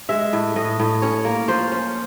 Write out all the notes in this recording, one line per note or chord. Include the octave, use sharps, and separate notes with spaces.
G#3 E5
A2
A2 D#5
A2
C#4 C#5
A#3
F3 C5
C#4